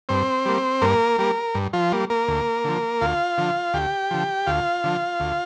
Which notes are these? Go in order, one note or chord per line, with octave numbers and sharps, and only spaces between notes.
G2 C4 C5
G3 A#3
G2 A#3 A#4
G3 A#3
G2
F3 F4
G3 A#3
A#3 A#4
D2
D3 F3
D2 F4 F5
D3 F3
D2 G4 G5
D3 F3
D2 F4 F5
D3 F3
D2